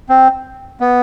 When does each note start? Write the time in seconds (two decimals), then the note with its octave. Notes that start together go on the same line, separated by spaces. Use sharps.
0.09 C4
0.80 B3